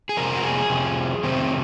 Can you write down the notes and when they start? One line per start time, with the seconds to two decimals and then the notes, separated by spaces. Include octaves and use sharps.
0.09 G#4
0.17 F2 C3 A#4
0.35 F#4
0.43 G#4
0.70 F2 C3
1.23 F2 C3 D#3 C4